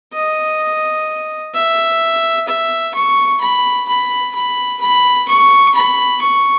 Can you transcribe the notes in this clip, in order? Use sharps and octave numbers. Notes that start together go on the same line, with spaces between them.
D#5
E5
E5
C#6
B5
B5
B5
B5
C#6
B5
C#6